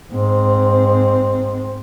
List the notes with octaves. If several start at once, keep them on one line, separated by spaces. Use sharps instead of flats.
G#2 C4